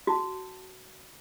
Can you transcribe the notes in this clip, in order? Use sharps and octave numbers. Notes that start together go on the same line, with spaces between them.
F#4 A5